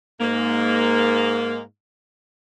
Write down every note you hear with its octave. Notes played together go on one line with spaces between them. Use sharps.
G#2 A#3